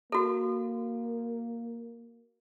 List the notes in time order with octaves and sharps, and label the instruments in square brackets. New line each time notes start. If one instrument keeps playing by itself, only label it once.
[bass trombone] A#3 [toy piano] F#4 A4